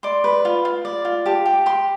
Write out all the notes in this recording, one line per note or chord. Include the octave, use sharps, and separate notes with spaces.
D5 C6
B4
F4
F4
D5
F4
G4 A5
G4
G4 C6